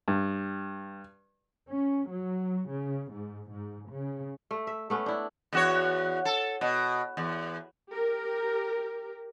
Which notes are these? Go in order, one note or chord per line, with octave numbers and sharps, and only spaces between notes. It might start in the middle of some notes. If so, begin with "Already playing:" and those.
G2
C#4
F#3
C#3
G#2
G#2
C#3
A3
E5
A3 B3 C#4
D4 E4
E2 F#4 C#5
A4
B2
E2
G4 A#4